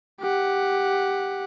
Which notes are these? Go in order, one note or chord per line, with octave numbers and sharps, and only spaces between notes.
G4 F#5